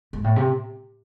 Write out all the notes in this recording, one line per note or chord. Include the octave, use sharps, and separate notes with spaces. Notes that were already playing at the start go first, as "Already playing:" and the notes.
G#2
A2
C3